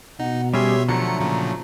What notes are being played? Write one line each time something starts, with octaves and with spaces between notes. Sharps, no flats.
B2 D#4 F#5
G3 C#4 G4 G#4 C#5 E5 C6
D3 F3 F#3 A3 A#5 C#7
A#2 C#3 F3